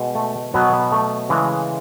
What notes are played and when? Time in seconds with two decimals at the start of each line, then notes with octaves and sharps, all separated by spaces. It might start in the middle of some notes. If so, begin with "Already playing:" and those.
Already playing: B2 G#3
0.15 A3
0.54 B2 F#3 B3
0.73 B3
0.92 A3
1.29 C#3 E3 G#3